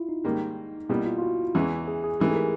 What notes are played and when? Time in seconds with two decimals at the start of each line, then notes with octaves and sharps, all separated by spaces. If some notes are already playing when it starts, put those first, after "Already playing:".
Already playing: E4 F4
0.09 D#4
0.24 G#2 D#3 G3 A#3
0.89 B2 G3 A#3 E4
1.06 F4
1.18 F4
1.22 F#4
1.55 E2 C#3 E3 G#3
1.88 G#4
2.04 G#4
2.20 G#2 E3 A3 G4
2.29 G#4
2.36 A#4